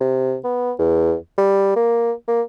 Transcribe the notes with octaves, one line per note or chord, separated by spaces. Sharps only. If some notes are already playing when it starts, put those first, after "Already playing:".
C3
B3
E2
G3
A#3
A#3